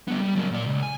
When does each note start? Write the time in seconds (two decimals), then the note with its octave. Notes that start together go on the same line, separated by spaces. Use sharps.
0.08 G3 B3
0.21 G3
0.36 F#3 A#3
0.51 A#2 D5
0.66 C#2
0.82 G#5